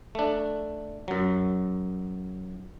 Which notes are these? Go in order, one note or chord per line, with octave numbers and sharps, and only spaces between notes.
A3 D4
F#2 F#3